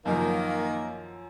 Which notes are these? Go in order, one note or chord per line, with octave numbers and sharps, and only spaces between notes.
F#2 D#3 F3 F#3 A#3